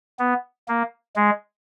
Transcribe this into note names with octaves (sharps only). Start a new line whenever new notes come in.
B3
A#3
G#3